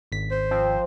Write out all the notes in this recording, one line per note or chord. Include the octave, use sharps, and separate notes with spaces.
G#1 B6
C5
F3 C4